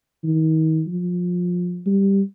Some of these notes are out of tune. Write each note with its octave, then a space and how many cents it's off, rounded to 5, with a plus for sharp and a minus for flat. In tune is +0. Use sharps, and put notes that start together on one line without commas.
D#3 +35
F3 +25
G3 +5